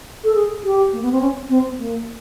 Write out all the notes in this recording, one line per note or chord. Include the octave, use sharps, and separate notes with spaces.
A4
G#4
G4
A#3
B3
C4
C#4
C4
B3
A#3